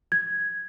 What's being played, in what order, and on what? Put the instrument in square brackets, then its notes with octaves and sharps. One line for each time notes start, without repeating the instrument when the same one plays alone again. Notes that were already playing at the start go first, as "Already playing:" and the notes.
[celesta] G#6